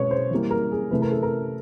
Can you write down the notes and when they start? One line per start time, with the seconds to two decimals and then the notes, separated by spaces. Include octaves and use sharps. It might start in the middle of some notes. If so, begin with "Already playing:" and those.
Already playing: B2 G#3 B3 C#5
0.11 C5
0.31 E3 G3 A#3
0.51 A#4
0.72 G#4
0.91 C3 E3 A3 B4
1.02 A#4
1.12 A4
1.23 A#4